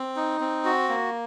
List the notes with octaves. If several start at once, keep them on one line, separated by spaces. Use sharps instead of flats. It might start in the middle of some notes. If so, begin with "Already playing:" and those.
Already playing: C4
D#4
C4
F#4
A#3